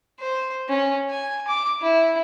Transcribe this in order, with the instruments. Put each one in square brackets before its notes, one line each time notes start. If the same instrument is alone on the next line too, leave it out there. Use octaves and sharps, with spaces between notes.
[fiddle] C5
C#4
G#5
D6
E4